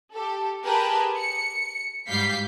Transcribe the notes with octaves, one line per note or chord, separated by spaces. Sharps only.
G4 A4
G4 G#4 A#4 B4 G5 A5
C#7
G#2 G3 F5 G6 B6 C7